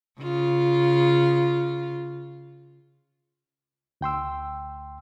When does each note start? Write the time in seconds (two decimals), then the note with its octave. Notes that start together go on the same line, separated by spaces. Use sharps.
0.21 C#3 F4
4.01 D2 G5 C6 E6